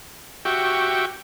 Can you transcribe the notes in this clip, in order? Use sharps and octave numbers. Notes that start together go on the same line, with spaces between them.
F#4 G4 E5 G5 C#6